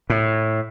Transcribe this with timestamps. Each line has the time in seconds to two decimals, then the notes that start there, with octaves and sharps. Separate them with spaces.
0.10 A2